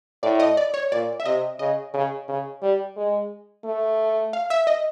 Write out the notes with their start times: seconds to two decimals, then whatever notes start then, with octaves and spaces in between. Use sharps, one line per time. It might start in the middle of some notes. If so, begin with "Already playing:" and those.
0.23 A2 D5
0.40 D#5
0.57 D5
0.74 C#5
0.92 A#2 D5
1.20 E5
1.25 C3 D#5
1.59 C#3 D#5
1.94 C#3
2.28 C#3
2.62 G3
2.96 G#3
3.64 A3
4.33 F5
4.50 E5
4.67 D#5